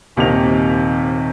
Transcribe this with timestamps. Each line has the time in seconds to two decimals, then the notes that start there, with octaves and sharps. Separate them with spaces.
0.16 D#1 D#2 C3 D#3 D#5 F7